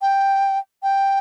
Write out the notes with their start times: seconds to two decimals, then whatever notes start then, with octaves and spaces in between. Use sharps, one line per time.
0.01 G5
0.83 G5